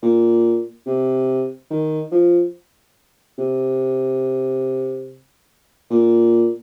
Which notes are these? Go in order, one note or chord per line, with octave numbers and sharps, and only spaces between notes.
A#2
C3
D#3
F3
C3
A#2